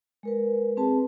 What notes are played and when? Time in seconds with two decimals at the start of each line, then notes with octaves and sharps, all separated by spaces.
0.23 G#3 A#4 B4
0.77 C4 G#4 B4 A5